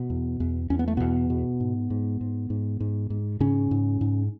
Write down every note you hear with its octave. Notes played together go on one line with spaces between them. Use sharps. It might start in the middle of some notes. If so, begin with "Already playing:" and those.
Already playing: B2 B3
E2
E2
E2 C#4
B3
A3
E2 B2 B3
B2
G#2
G#2
G#2
G#2
G#2
G#2
G#2 C#3 C#4
G#2
G#2